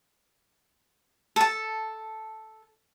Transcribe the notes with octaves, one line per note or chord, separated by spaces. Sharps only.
A4 A5